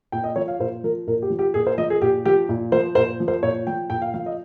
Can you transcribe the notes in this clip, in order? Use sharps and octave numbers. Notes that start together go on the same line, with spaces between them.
A#2 G5
D#5
F3 C#5
F5
A#2 C5
F3 A#4
A#2 A#4
G4
F3
G4
A#2 G#4
C5
F3 D#5
G#4
A#2 G4
F3 G4
A#2
F3 C5
A#2 C5
F3
C5
A#2 C#5
F3 G5
A#2 G5
F5
F3 F5
D#5